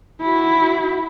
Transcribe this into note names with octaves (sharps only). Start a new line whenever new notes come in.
E4 F#4